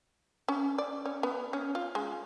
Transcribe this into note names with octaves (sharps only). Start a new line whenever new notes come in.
C#4
D5
C#4
B3
C#4
F4
G#3